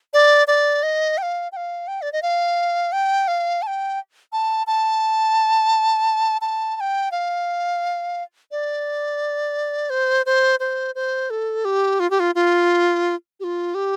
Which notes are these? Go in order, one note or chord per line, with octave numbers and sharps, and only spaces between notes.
D5
D5
D#5
G5
F5
G5
F5
G5
D5
D#5
F5
G5
F5
A5
G5
A5
A5
A5
A5
G5
F5
D5
C5
C5
C5
C5
A4
G4
F4
G4
F4
F4
G4
F4
G4